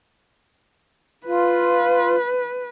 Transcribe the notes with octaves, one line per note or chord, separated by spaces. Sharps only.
F4 B4